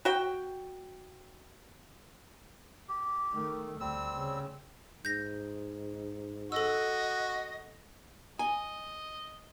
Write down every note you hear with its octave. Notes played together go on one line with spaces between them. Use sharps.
F#4 G5
G4
D#3 A3
D2 G3 C4 E6
C#3
G#2 G6 A#6
F#4 A4 D#5 E6
D#5 G#5